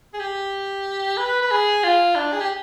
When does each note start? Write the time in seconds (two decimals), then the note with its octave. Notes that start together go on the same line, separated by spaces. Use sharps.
0.14 G#4
0.19 G4
1.17 B4
1.42 B4
1.51 G#4
1.83 F4
2.16 D4
2.33 G#4
2.40 G4